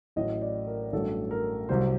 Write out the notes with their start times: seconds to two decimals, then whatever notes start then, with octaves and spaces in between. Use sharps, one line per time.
0.16 A1 A2 F#3 D#5
0.41 D5
0.67 A#4
0.92 A1 G2 F#3 A4
1.31 A#4
1.69 C2 C3 F#3 C5